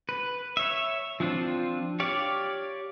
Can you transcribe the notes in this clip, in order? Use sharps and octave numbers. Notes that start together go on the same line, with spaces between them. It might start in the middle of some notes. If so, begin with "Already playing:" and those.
B4
C#5 E5
F3 C4 D4 F4
G4 C#5 D5 F5